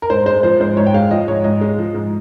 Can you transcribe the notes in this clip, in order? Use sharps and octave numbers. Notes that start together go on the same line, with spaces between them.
A#4
G#2 C5
G#3 C5
F3 C5
G#2 C5
G#2 C#5
G5
G#3 F5
F3 D#5
G#2 C#5
G#2 D#5
G#3
F3
G#2